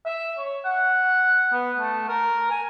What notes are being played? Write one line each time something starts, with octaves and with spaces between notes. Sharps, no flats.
E5
C#5
F#5
B3
A3
A#4
G#5